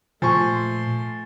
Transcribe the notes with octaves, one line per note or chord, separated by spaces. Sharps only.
A#2 F3 A3 G#5 C6 C#6